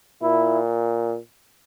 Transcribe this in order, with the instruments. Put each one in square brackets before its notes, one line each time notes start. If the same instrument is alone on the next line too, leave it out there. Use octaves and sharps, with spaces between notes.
[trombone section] A#2 E4